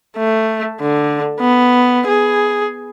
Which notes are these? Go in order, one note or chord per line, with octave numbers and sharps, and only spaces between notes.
A3
D3
B3
G#4